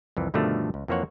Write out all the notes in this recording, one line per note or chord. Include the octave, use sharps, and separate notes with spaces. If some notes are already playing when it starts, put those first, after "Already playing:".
C2 F2 E3
G2 B2 D3 D#3 F3 A3
C#2
F2 E3 A#3 C5 C#5 F#5